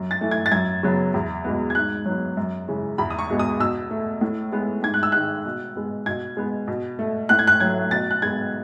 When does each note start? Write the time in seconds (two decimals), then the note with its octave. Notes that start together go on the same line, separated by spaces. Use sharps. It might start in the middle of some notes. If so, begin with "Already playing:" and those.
Already playing: F#2
0.11 A6
0.21 E3 A3
0.31 G#6
0.46 A6
0.52 F#2 G#6
0.83 C#3 F#3 B3
1.14 E2
1.44 B2 G#3 B3
1.70 G#6
1.75 G#2 F#6
2.06 F#3 B3
2.37 F#2
2.68 C#3 E3 G#3
2.98 E2 B5
3.10 D#6
3.19 C#6
3.30 B2 G#3 B3
3.39 D#6
3.60 B2 E6
3.91 A3
4.21 A2
4.52 G#3 B3
4.83 G#2 G#6
4.94 F#6
5.03 E6
5.12 D#3 G#3 F#6
5.46 B2
5.76 G#3 B3
6.06 B2 G#6
6.37 G#3 B3
6.68 B2
6.99 A3
7.29 A2 F#6
7.39 G#6
7.47 F#6
7.60 F#3 A3 G#6
7.91 B2 A6
8.11 F#6
8.22 G#3 B3 G#6